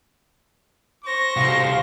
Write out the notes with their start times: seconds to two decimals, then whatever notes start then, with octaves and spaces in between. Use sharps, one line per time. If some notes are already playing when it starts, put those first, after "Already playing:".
1.04 C5 C#6 A#6
1.36 C2 F#4 F5